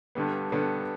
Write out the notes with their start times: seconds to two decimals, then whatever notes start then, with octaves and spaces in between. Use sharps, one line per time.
0.15 G2 D3 G3 B3
0.52 G2 D3 G3 B3